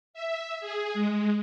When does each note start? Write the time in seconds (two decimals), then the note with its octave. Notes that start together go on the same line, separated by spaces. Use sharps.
0.14 E5
0.60 G#4
0.94 G#3